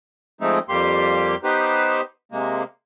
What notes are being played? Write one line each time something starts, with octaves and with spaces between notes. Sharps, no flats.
F3 G#3 A3 C4 D#4 E4
F2 G3 A#3 G4 C6
B3 D#4 G4 B4 C5
C3 G#3 A#3